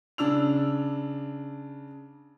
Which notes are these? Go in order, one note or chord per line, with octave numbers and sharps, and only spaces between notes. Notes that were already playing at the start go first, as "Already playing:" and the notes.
C#3 D4 E6 F7